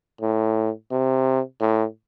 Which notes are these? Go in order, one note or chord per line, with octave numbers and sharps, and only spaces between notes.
A2
C3
A2